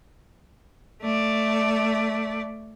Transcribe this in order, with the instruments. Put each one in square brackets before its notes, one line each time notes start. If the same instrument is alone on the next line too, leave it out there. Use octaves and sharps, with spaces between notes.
[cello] A3 D5